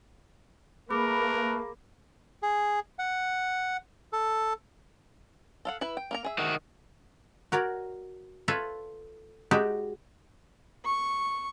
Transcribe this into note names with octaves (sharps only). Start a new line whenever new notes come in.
A3 A#3 G#4 A#4 B4 B5 D6
G#4
F#5
A4
A4 F5 F#5
E4 B4
G5
A#3 A#4 A#5
G#4 E5
D#3 F#4
F#4 A#4 C#5 D5
F4 A4 B4 C#5 E5
G#3 D#4 F#4 G4 D5 E5
C#6